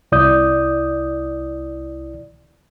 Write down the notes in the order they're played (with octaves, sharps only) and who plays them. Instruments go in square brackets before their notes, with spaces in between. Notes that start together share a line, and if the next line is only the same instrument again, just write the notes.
[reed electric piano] C2 E4 D5 D#6 G6